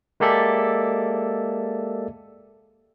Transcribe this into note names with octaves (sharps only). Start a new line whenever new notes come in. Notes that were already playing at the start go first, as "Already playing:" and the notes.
G#3 A#3 G4 A4 D5 E5